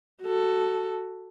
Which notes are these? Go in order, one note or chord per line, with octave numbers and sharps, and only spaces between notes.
F#4 A4